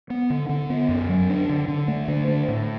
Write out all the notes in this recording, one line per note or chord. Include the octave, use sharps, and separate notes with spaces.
B3
D3
D3
B3
F#2
F#3
D4
D3
D3
A3
D3
A3
A2